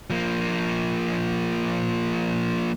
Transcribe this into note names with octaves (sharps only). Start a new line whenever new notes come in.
F3 A#3